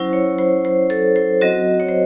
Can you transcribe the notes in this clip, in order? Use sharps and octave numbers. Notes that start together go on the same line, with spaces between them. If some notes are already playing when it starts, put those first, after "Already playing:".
Already playing: F#3 C#4 E4 C5
C#5
C5
C5
A4
C5
F#3 C4 F#4 D#5
C#5
C5